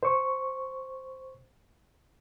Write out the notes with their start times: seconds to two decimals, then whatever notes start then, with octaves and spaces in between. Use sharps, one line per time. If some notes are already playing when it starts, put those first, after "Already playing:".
0.03 C5 C#6